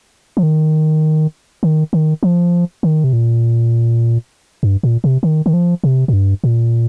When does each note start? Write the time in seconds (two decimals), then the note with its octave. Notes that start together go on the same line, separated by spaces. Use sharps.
0.37 F3
0.43 D#3
1.63 D#3
1.93 D#3
2.23 F3
2.83 D#3
3.04 C3
3.13 A#2
4.63 G2
4.83 A#2
5.04 C3
5.23 D#3
5.46 D#3
5.53 F3
5.84 C3
6.08 A#2
6.13 G2
6.44 A#2